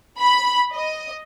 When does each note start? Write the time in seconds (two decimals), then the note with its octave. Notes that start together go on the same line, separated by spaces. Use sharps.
0.18 B5
0.75 D#5